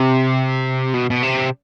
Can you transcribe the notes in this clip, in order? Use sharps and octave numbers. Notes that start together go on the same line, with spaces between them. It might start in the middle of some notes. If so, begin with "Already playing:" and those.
Already playing: C3
B2
B2
C3